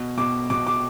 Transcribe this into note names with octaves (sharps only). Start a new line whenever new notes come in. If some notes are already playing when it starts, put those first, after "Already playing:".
Already playing: B2
B2 D6
B2 D6
D6